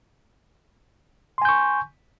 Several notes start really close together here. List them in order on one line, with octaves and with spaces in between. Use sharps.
C6 G#5 G6 C#6